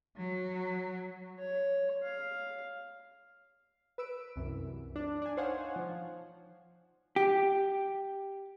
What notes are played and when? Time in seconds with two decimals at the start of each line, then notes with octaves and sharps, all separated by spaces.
0.16 F#3
1.39 C#5
2.03 F5
3.98 B4 E6 D7
4.36 C2 F#2 E3
4.96 D4
5.22 D4 G#5
5.37 D#4 C5 C#5 F5 F#5 G#5
5.76 F3
7.16 G4